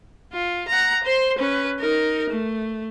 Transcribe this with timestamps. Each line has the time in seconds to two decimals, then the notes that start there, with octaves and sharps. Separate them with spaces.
0.33 F4
0.68 F#5 A#5
1.04 C5 C6
1.39 C#4 B4
1.80 D#4 A#4
2.30 A3